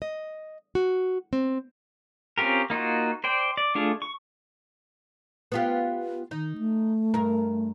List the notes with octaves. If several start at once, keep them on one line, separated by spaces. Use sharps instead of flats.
D#5
F#4
C4
C4 C#4 F4 G4 A#4
A#3 D#4 F4 F#4
C5 D5 G5
D5
A3 D4 F4 G#4
C#6
B3 F4 G4
D#3 D#4
A3
G2 A#4